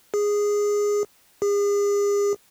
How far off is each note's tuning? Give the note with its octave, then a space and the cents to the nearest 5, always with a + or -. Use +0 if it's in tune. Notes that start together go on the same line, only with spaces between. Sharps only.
G#4 -10
G#4 -40